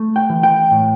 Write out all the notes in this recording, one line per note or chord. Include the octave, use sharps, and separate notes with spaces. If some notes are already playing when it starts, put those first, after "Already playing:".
Already playing: A3
G5
E3
G5
A2